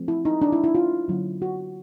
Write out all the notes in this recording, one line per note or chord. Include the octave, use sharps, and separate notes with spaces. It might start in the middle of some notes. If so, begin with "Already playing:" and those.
Already playing: F3 A3 C4
E4
D#4
D4
E4
E4
F4
D3 F#3 A#3 C#4
F#4